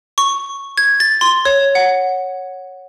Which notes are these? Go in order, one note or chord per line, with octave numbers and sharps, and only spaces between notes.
C#6
G#6
A6
C6
C#5
F#5